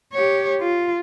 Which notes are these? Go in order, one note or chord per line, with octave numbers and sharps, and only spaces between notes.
G4 C#5
F4